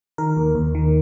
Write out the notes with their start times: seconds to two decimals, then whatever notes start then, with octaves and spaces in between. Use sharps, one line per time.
0.18 D#3 A#4
0.37 D#2
0.55 D#2
0.75 D#3